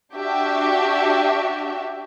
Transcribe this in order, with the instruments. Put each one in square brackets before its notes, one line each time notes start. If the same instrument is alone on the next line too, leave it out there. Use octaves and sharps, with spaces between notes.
[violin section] D4 F#4 G4 E5